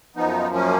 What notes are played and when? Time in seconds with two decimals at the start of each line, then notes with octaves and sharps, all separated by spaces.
0.16 F#2 F3 B3 D#4
0.54 A#3 C#4